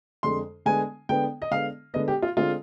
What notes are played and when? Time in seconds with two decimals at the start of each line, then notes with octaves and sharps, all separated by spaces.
0.23 F2 D3 G#3 C6
0.66 D3 G#3 B3 G#5
1.09 D3 G#3 B3 G5
1.42 D#5
1.51 D3 G#3 B3 F5
1.94 D3 G#3 B3 D#5
2.08 G4
2.22 F4
2.37 D3 G#3 C4 F4